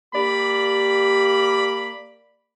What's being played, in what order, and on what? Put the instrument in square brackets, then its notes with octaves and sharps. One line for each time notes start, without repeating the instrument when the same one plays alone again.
[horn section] A#3 D5 B5 [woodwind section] G4